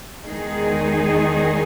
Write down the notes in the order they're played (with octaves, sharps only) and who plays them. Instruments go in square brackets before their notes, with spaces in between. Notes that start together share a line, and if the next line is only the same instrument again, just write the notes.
[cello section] E2 D#3 G#3 D#4 G#4